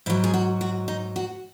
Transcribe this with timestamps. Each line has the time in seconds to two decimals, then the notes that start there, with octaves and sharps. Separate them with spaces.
0.06 G#2 F#3 E4
0.24 G#4
0.34 F#4
0.61 F#4
0.88 D#4
1.16 F#4